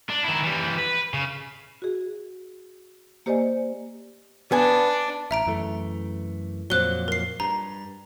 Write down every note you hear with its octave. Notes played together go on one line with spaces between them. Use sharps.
D4
D#3 E4
E3 G3
B4
C#3
F#4 G#4
A#3 G4 C5 D5 D#5 G#5
B3 D4 G#5
A1 E5 A#5 D7
F#2 E3 A3
F2 A#2 F#3 C5 F#6 G7
A#4 C7
G2 A#5